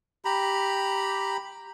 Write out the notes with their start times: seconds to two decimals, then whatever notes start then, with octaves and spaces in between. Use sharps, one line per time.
0.25 G4 A#5 B5